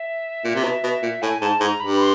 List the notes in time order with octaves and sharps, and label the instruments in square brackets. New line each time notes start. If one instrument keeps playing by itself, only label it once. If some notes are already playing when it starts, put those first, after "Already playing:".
Already playing: [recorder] E5
[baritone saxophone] A#2
C3
B2
B2
A#2
[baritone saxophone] A2 [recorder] G#5
[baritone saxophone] G#2 [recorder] A5
[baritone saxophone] G#2 [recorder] A#5
[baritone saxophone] G2 [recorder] B5
[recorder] C6